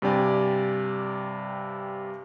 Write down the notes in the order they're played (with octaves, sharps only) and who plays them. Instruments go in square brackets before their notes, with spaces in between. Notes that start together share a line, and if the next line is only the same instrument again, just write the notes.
[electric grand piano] G2 C3 G4 D5 G#5